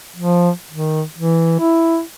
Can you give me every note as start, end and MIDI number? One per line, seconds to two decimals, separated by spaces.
0.16 0.50 53
0.71 1.02 51
1.18 1.58 52
1.60 2.01 64